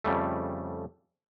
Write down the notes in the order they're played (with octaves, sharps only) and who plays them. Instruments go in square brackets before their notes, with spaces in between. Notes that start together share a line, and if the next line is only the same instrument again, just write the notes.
[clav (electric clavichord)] F2 C#3 G3 A3